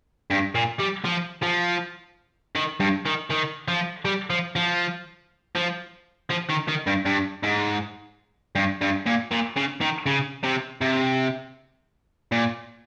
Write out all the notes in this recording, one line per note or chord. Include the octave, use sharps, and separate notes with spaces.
G2
A#2
G3
F3
F3
D#3
G2
D#3
D#3
F3
G3
F3
F3
F3
F3
D#3
D#3
G2
G2
G#2
G2
G2
A#2
A#2
C#3
D#3
C#3
C3
C3
A#2